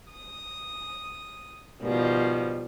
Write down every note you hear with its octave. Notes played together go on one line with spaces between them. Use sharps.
D#6
B2 D#3 F3 G3